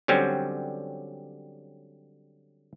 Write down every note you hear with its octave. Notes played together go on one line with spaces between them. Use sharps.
D3 F#3 G3 C4 C#4